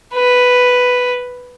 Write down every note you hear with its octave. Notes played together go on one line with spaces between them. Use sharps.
B4